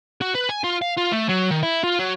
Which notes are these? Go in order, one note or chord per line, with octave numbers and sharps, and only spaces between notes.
F#4
B4
G#5
F4
F5
F4
A3
F#3
D#3
E4
F4
F#3